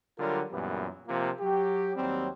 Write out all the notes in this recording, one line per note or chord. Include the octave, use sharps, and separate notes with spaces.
D3 F#3 G3 F4 A#4
F#2 A#2 E3 G3 B3
C3 F3 A#3 F4
F#3 G4
D#2 F#3 G3 C4